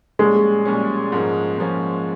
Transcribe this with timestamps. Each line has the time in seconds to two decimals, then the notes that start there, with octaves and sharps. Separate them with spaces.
0.19 A#1 A#2 G3 G#3 C#4
0.65 A#1 A#2 G3 C#4
1.12 G#2 F3 A#3 C#4
1.58 G#2 F3 A#3 C#4